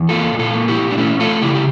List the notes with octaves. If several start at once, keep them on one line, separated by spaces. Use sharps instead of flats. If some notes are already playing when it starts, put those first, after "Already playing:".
Already playing: E2
A#3 F4 A4
A#2
F4 A4
A#3
E4 G4
A#2
D4
A3 C#4 E4
A3 F4 A4
C#3 E4 G4
G4